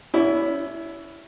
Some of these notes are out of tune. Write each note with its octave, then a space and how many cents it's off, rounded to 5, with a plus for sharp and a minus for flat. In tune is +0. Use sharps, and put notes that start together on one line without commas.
C#4 +35 E4 +0 D5 +25